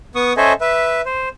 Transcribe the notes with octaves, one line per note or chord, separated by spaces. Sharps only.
B3 C#6 D#6
C#4 A4 C5 D#5 E5 G#5
B4 E5
C5